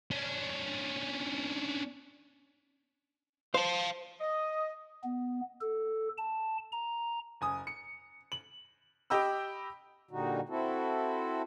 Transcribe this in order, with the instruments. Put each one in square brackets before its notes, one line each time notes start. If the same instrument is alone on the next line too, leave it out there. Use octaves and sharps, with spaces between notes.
[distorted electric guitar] C#4 D4
[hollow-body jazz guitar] C5 [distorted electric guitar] F5 A5
[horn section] D#5
[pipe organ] B3
A4
A5
A#5
[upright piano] F#1 G#5 D#6
C#7
F#7
G4 D#5 G5 B5 E6
[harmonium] A#2 D3 G3 D#4 F#4
C4 E4 F#4 A4